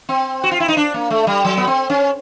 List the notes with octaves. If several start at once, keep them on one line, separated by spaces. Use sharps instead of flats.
C4
F#4
F4
E4
D#4
D4
A#3
A3
G3
F#3
B3
C4
C#4